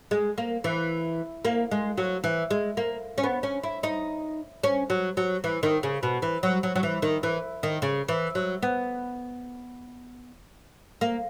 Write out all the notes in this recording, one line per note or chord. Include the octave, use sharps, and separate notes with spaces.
G#3
A#3
E3
A#3
G#3
F#3
E3
G#3
A#3
C#4
B3
C#4
E4
D#4
C#4
F#3
F#3
E3
D#3
C#3
B2
E3
F#3
F#3
F#3
E3
D#3
E3
D#3
C#3
E3
F#3
B3
A#3